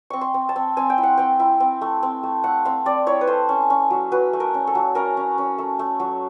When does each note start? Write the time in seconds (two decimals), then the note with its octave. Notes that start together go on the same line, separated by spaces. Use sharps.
0.10 C4 C#6
0.21 C6
0.34 C4
0.49 A5
0.56 C4
0.77 C4 G#5
0.90 G5
0.98 E4
1.03 F#5
1.18 C4 G5
1.40 E4
1.60 C4
1.81 A3
2.03 C4
2.23 A3
2.44 A3 F#5
2.65 C4 F5
2.86 C4 D5
3.06 E4 C#5
3.21 B4
3.27 A3 C5
3.49 C#4
3.70 C#4
3.90 F#3
4.12 F#3 B4
4.33 A3
4.40 A#4
4.54 C#4
4.67 A4
4.75 F#3
4.95 C#4 A#4
5.17 C#4
5.38 C#4
5.58 A3
5.79 A3
6.00 F#3